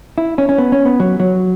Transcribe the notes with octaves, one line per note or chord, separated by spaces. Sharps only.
E4
C#4
C#4
B3
C#4
B3
F#3
F#3